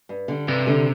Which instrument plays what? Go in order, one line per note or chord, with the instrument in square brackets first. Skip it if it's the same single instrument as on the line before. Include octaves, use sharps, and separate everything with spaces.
[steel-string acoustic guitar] G2
D3 G3
[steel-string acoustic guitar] G2 [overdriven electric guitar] C3
[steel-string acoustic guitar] D3 G3